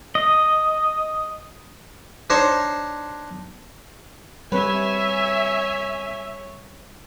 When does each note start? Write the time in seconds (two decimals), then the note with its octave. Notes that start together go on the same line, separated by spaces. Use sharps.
0.15 D#5
2.30 D4 D#4 C5 C#5
4.52 G3 C4 B4 C#5 E5 G#5